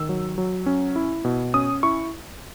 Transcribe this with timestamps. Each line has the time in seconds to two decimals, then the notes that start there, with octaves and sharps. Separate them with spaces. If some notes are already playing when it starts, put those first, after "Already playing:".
Already playing: D#3 E6
0.09 F#3
0.38 F#3
0.66 C#4
0.96 E4
1.25 B2
1.54 C#4 D#6
1.83 E4 C#6